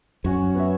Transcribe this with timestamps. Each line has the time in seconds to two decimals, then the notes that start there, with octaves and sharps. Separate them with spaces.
0.24 F#2 C#4 F#4 C#5
0.54 B3 F#4 C#5 E5